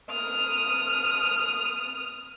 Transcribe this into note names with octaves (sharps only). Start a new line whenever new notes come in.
D#6 F6